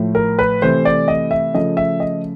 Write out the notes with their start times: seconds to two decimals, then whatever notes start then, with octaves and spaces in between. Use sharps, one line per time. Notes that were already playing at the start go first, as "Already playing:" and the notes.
Already playing: A2 F3 A3
0.15 A#4
0.39 B4
0.62 C3 E3 A3 C5
0.85 D5
1.08 D#5
1.31 E5
1.54 C#3 F3 A3 D#5
1.77 E5
2.00 D#5